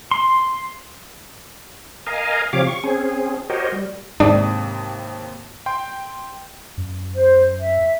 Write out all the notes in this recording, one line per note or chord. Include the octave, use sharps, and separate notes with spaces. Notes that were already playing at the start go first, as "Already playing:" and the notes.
C6
A#4 D#5 F5 G#5 A#5
C3 F3 G4 C#5 F5 D6
C#6
C4 C#4 G#4
F#4 G4 A#4 C5 C#5 D#5
G3
D#2 G#2 C3 D4 D#6
G5 C6 G6
F#2
C5
E5